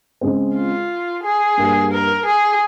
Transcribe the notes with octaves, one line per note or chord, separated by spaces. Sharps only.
C#3 G#3 C4
F4
G#4
G2 G3 A#3
A#4
G#4